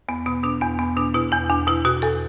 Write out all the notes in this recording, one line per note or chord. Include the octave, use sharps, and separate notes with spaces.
E2 B3
B2 B3
B2 D4
E2 B3
E2 B3
B2 D4
B2 E4
E2 E4
E2 D4
B2 E4
B2 F#4
E2 A4